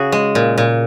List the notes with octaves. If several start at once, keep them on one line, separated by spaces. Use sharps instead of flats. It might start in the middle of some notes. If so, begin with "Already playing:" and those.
Already playing: C#3 F#4 G#4
G#3
A#2
A#2